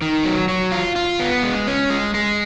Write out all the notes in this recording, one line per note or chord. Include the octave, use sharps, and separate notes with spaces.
D#3
F#3
F#3
F4
F4
B3
G#3
C#4
G#3
G#3